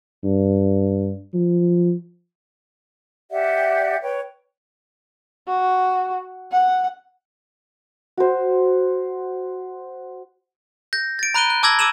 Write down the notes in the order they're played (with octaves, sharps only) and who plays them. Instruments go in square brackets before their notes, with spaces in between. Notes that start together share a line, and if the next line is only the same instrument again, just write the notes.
[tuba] G2
F3
[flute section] G4 D5 E5 F#5
B4 C#5 G5
[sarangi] F#4
F#5
[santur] F#4 C5
[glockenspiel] G6 A#6
A6 D7
A#5 B5 F#6 D7 D#7 G7
F#6
A5 D6 E6 G#6 A#6 F#7
D6 E6 D#7 E7 F#7